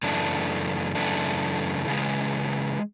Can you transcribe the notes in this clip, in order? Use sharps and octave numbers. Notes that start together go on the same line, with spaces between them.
F#2 C#3 E3 A3 D4
F#2 C#3 E3 A3 D4
C#3 E3 G#3